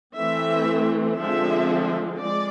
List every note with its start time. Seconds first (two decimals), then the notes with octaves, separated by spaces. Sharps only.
0.16 E3 A3 C4 E5
1.18 D3 F3 G#3 C4 E5
2.20 G#3 D5